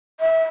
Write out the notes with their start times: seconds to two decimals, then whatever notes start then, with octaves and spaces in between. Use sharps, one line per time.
0.20 E5